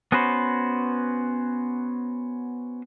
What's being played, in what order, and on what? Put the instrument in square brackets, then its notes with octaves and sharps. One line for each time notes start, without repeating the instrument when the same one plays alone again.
[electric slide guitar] B3 C#4 F#4 B4 C5